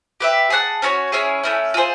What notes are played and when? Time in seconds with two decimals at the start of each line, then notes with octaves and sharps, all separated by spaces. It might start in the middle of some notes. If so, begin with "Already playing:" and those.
0.20 G4 B4 E5
0.50 G#4 C#5 F#5 A5
0.82 C#4 F#4 A4 C#5
1.12 C#4 E4 G#4 C#5
1.43 A3 C#4 E4
1.74 F4 G#4 C5